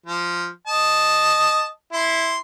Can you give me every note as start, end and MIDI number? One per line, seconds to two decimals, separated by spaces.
0.06 0.47 53
0.67 1.66 75
0.67 1.66 81
1.93 2.37 64
1.93 2.37 84